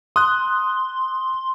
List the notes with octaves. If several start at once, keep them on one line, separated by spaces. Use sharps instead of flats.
C6 D#6 F#6